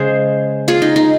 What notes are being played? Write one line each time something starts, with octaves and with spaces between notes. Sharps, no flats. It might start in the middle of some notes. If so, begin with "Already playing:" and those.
Already playing: C#3 G#3 G#4 C5
F4 G#4
D#4
D#4